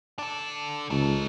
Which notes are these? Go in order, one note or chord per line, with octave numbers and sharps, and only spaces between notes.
D4 A4
C#2 D#4 A4